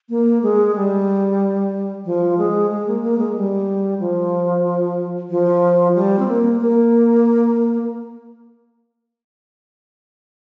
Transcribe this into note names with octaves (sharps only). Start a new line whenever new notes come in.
A#3
G#3
G3
F3
G#3
G#3
A#3
A#3
G#3
G3
F3
F3
G3
C4
A#3
A#3